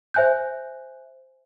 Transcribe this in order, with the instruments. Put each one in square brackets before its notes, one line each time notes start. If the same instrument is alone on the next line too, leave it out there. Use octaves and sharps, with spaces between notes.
[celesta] C5 E5 G#5 F#6 G6